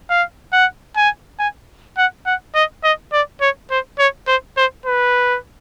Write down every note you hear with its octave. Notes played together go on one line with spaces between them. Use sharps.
F5
F#5
G#5
G#5
F#5
F#5
D#5
D#5
D5
C#5
C5
C#5
C5
C5
B4